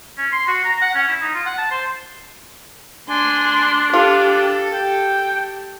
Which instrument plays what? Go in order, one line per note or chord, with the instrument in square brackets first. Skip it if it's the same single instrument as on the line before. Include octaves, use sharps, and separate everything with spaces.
[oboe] C#4
C6
F#4
A#5
F#5
C#4
E4
D#4
F4
F#5
A5
C5
[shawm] D4 [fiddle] G#5 [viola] C6
[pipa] F4 [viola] G4 [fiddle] A4
[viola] G4 [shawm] G5